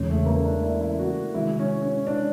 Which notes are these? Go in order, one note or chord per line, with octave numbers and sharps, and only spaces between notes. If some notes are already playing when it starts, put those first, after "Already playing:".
Already playing: E2 C#3 E3 G#3 C#4
A3
A#3
D4
E4
E4
F#4
C3 D#3 G#3 E4
C#4
C#4
D4